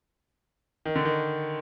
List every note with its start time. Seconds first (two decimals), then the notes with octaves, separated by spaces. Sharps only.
0.85 D#3
0.96 D3
1.05 D#3